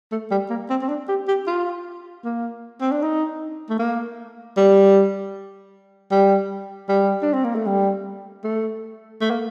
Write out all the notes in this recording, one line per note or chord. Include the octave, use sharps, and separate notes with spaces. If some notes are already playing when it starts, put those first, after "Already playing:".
A3
G3
A#3
C4
C4
D4
G4
G4
F4
A#3
C4
D4
D#4
A3
A#3
G3
G3
G3
D4
C4
A#3
A3
G3
A3
A3
A#3